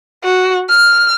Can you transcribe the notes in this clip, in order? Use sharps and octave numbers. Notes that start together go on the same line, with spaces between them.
F#4
F6